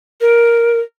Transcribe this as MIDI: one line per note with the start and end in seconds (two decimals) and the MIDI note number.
0.21 0.80 70